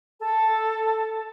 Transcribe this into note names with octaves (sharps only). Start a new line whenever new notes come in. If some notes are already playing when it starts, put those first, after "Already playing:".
A4